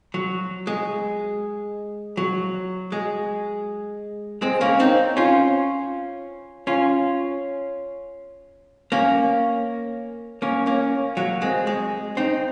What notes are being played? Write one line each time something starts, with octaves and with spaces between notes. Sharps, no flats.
F#3
G#3
F#3
G#3
G#3 C4
A#3 C#4
C4 D#4
C#4 F4
C#4 F4
A#3 C#4
A#3 C#4
A#3 C#4
F#3 A#3
G#3 C4
G#3
C4 D#4